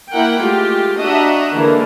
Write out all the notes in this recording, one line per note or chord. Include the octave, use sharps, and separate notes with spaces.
A#3 E4 A#4 F#5 G5
G#3 A3 F4 G4
D4 F#4 D#5 E5 F#5 A#5
D3 E3 G#3 A#3 A#4